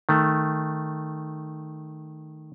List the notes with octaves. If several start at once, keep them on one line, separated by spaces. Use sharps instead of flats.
D#3 A3